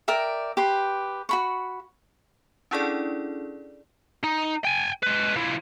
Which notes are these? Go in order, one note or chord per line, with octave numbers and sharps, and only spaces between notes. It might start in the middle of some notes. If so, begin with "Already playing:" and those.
A#4 D5 E5 G5
G4 B4 C6
F#4 B5 C#6
C#4 D4 E4 G#4 A4 D5
D#4
G5 G#5
G#3 B4
F3 E4